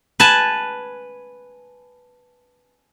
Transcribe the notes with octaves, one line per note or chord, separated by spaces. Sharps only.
B4 G#5 A5